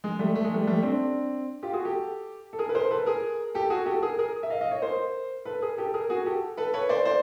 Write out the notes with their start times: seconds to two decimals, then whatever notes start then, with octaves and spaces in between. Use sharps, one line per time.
0.04 G#3
0.19 G3 A3
0.35 A3
0.44 G#3
0.54 G3 A3
0.67 G3 A3
0.83 C4 D4
1.63 F4 G4
1.73 F#4 G#4
1.85 G4 A4
2.53 A4
2.59 G#4 A#4
2.69 B4
2.75 A#4 C5
2.90 A4 B4
3.06 G#4 A#4
3.55 G4 A4
3.70 F#4 G#4
3.86 G4 A4
4.02 G#4 A#4
4.19 G#4 A#4
4.43 E5
4.50 D#5 F5
4.61 D#5 F5
4.71 C#5 D#5
4.82 A#4 C5
5.45 A4 B4
5.62 G#4 A#4
5.78 G4 A4
5.94 G#4 A#4
6.10 F#4 G#4
6.26 G4 A4
6.57 A4 B4
6.74 B4 C#5
6.89 C5 D5
7.05 C5 D5